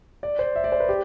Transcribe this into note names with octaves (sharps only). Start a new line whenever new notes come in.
D5
C5
E5
D5
C5
B4
G4